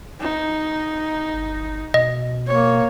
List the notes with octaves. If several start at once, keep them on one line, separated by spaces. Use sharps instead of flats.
D#4
G1
B2 D#5
A#3 C#5